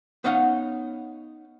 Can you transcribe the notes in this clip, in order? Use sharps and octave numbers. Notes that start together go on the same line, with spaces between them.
B3 C#4 D#4 D#5 F5 F#5